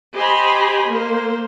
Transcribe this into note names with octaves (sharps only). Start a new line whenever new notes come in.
G4 C5 D#5 G#5 B5
A#3 C5